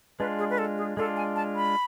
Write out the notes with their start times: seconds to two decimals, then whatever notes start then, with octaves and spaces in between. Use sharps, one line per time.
0.19 G#3 D4 F4 B4
0.38 G#4
0.50 B4
0.58 A4
0.77 G#4
0.97 G#3 D4 F4 A4
1.16 G#5
1.36 A5
1.55 B5